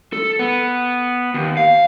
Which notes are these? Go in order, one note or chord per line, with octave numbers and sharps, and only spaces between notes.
A4
B3
D#2
F5